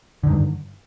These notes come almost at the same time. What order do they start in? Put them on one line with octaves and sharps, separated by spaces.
D3 D#3 G2